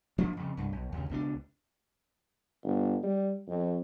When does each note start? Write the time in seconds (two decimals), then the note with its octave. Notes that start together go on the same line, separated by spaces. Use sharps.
0.18 F3 A#3 D4
0.37 F2 C#3
0.57 C2 G2
0.72 B1
0.92 D#2 C#3
1.10 C#2 B2 G#3 D4
2.64 G1
3.03 G3
3.48 F2